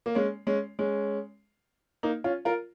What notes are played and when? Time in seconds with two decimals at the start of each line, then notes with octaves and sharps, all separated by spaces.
0.06 A#3
0.15 G#3 C#4
0.47 G#3 C#4
0.79 G#3 C#4
2.03 A#3 D#4
2.24 C#4 F4
2.45 F4 A#4